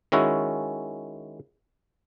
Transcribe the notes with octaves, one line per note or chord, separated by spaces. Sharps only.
D#3 G#3 C#4 E4 F#4